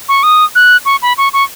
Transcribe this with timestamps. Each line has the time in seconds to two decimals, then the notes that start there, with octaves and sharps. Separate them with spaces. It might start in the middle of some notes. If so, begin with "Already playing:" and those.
0.09 C#6
0.23 D#6
0.55 F#6
0.85 C#6
1.02 B5
1.18 C#6
1.33 C#6